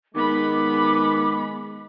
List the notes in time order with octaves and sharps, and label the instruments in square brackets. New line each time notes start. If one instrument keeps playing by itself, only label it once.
[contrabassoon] D#3 [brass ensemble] G#3 [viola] B3 B5 [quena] D6